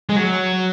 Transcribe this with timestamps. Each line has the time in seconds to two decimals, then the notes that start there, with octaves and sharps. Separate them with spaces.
0.09 G#3
0.16 F#3